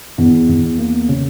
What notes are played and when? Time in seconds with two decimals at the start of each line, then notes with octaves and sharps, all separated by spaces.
0.18 E2
0.49 E2
0.78 A#3
1.09 C#3